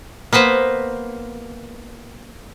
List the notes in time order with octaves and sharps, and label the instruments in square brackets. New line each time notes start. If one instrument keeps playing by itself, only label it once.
[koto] A#3 B3 B4 C5